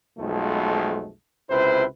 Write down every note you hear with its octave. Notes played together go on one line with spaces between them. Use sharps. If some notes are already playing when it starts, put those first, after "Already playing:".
B1 F2 B2 F3 G#3 A3
C#2 C3 E4 B4 C5